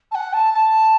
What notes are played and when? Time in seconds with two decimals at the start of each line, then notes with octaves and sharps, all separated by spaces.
0.11 A5
0.14 F#5
0.33 A5
0.53 A5